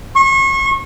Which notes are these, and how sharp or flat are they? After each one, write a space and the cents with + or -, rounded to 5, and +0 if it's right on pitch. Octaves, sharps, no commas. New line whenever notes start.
C#6 -35